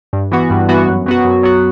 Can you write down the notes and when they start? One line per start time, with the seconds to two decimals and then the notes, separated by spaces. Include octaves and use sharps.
0.13 G2
0.32 E3 B3 F#4
0.50 G2
0.69 E3 B3 F#4
0.88 F#2
1.06 F#3 B3 F#4
1.25 F#2
1.43 F#3 B3 F#4